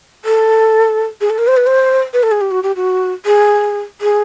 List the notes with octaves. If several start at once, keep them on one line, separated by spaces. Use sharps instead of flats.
A4
G#4
A4
A#4
C5
B4
C5
B4
A4
G#4
G4
F#4
G4
F#4
G#4
G#4